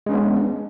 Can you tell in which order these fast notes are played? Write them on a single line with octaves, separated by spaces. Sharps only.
G#3 C#4 D4 B3